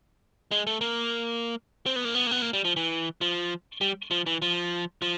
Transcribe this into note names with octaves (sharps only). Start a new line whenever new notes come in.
G#3
A3
A#3
C4
B3
A#3
B3
A#3
B3
A#3
G3
F3
E3
F3
G3
F3
E3
F3
F3